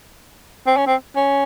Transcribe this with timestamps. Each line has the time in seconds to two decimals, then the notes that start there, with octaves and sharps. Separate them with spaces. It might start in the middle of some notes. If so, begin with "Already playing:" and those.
0.67 C4
0.77 C#4
0.87 C4
1.16 C#4